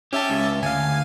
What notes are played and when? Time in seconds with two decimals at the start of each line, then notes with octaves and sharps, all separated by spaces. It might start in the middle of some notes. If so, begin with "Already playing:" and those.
0.13 C#4 G4 E5 A5
0.30 C#2
0.63 D2 F5 G#5